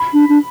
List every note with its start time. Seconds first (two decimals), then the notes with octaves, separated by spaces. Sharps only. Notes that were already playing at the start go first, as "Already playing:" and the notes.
Already playing: B5
0.13 D4
0.29 D4